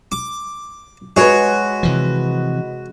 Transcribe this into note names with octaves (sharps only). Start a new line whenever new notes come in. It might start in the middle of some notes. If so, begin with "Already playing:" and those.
D6
G#3 F#4 B4 C#5 D#5
C3 E3 F3